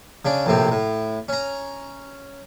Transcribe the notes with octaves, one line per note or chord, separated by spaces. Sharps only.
C#3 C#4 D4
A#1 A2 C3 C4
A2
C#4 A#5